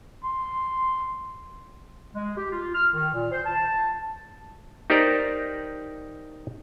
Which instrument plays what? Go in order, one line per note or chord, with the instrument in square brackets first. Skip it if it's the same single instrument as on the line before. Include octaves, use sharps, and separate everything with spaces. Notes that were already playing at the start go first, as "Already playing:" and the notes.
[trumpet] C6
[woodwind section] G#3
G4
F4
F6
D#3
A#2
C5
A5
[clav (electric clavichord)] D#4 G4 A#4 C5 D5 A#5